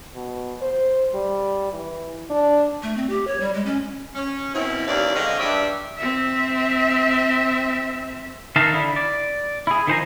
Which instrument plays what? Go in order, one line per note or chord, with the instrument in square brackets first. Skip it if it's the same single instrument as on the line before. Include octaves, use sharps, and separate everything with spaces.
[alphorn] B2
C5
G3
E3
D4
[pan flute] A3
C4
G4
C#5
G3
G#3
C#4
[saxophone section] C#4
B2 C4 C#4 E4
D#2 C3 E3 C#4 D5 F5
D3 G#3 C4 C#5 D#5 F5
G2 D5 E5
[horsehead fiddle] C4 E5
[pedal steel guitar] D#3 D#4 E5 F5 A5
D3 E4
D5
E4 G#4
D#3 F3 C5 G#5 A#5